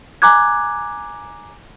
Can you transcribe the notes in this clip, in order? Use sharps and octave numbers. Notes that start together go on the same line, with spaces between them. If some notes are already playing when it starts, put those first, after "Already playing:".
G#5 A#5 D6 F#6 G#6